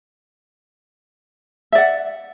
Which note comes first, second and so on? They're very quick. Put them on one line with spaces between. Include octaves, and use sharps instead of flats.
E5 D5 F#5